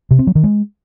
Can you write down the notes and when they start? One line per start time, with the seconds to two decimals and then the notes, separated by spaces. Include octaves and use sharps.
0.11 C3
0.19 C4
0.27 F#3
0.35 D#3
0.44 G#3